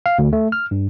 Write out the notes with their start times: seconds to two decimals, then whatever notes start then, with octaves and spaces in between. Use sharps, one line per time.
0.06 F5
0.19 D2
0.33 A3
0.52 F6
0.71 G2